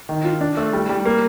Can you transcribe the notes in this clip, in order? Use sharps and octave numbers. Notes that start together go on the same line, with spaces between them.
D#3
F4
D4
A3
G3
G3
A#3